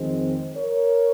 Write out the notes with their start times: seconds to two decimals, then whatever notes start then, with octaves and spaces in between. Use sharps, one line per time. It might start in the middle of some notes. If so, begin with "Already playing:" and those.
Already playing: F2 D#3 G#3 C4 G#4 C5
0.56 A#4 C#5